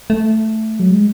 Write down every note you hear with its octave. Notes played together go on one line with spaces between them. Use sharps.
A3
F#3
G#3